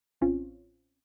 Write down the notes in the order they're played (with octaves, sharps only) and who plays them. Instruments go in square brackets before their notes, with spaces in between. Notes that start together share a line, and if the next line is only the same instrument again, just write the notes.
[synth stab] A1 C4 C#4 F4